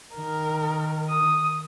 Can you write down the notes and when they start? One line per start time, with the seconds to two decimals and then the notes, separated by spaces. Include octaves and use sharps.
0.16 D#3 A#4
1.10 D#6